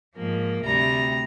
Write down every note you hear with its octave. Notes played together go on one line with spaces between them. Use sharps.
G#2 F3 A#3
D2 C3 G3 A#5